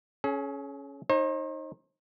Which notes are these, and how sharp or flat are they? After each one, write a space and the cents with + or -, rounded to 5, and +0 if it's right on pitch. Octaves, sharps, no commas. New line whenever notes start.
C#4 +0 G#4 +45
D#4 +0 C5 +45